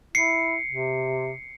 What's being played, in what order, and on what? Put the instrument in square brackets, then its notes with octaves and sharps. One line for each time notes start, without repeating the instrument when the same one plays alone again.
[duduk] E4 [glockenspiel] C7 C#7
[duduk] C3